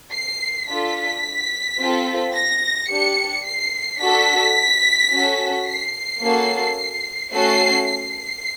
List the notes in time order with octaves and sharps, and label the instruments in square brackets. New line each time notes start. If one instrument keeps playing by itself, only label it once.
[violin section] C7
D4 F4 A4 B6
C4 F4 A4
A#6
D4 G4 C#7
C7
D4 F#4 A4 B6
C#4 F#4 A4
C7
A#3 C#4 F#4 A4
A3 C#4 F#4 A4 C7
C7